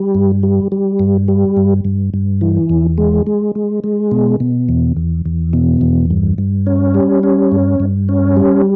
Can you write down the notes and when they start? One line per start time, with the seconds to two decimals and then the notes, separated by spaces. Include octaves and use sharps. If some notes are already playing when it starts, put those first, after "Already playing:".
Already playing: G3
0.15 G2
0.43 G3
0.72 G3
0.99 G2
1.28 G3
1.57 G2
1.85 G2
2.14 G2
2.41 E3
2.70 E2
2.98 G#3
3.27 G#3
3.55 G#3
3.84 G#3
4.11 B2
4.40 B2
4.69 E2
4.97 E2
5.26 E2
5.53 B2
5.81 E2
6.10 G2
6.38 G2
6.67 C#4
6.95 G3
7.23 C#4
7.52 G2
7.80 G2
8.09 C#4
8.37 G3